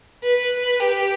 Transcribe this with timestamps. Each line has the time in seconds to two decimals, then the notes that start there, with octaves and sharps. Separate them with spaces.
0.23 B4
0.80 G4